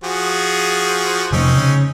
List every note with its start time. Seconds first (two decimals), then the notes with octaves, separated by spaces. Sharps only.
0.04 F3 F#4 G#4
1.33 C3 F3 A3 C4 C#4 D#4
1.56 C#3